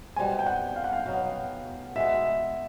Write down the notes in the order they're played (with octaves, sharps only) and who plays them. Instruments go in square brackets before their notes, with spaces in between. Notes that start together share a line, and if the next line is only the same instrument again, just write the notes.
[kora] B2 G3 C4 [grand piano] G#5
[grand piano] G5
F#5
F5
F#5
F5
[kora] B2 F#3 B3
[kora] B2 G#3 B3 [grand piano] E5